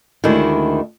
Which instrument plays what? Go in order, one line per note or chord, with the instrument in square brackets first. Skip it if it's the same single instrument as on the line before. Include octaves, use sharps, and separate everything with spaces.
[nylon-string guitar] D2 D#3 G#3 D4 E4